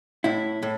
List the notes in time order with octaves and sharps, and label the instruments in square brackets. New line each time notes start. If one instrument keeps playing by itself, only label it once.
[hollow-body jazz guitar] A2 E4
A2